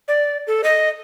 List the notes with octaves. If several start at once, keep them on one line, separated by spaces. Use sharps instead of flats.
D5
A4
D#5